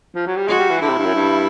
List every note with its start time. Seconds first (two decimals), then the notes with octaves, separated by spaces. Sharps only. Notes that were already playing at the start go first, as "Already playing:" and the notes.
0.15 F3
0.27 F#3
0.37 G3
0.48 G#3 F#4
0.59 G3
0.70 E3
0.81 D3 E4
0.89 C3
0.97 G2
1.06 F#2
1.14 G2